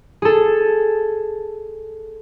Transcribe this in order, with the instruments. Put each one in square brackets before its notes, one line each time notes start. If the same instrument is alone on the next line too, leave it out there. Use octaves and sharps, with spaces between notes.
[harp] G#4 A4